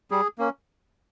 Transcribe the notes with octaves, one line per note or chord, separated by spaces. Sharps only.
G3 G#4
A#3 C#4